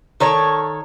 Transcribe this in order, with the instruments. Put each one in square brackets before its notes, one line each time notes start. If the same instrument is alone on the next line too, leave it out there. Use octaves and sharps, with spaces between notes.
[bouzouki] D#3 A4 C#5